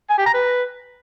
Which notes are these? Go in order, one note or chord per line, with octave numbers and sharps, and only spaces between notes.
G#5
G4
A#5
B4